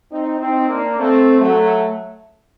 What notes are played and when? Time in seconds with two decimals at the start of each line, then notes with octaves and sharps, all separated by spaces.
0.11 C4 D#4
0.40 C4 D#4
0.68 A#3 D4
0.97 A3 C4
1.40 F#3 A3